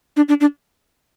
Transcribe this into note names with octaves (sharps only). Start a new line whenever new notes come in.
D4
D4
D4